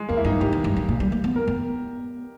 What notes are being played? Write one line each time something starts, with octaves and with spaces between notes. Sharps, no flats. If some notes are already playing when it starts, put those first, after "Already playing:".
Already playing: G#3
E2 A#3
E4
G2 D#4
G#2 G4
E2
G2
G2
A#2
G3
A#3
B3
A#4
B3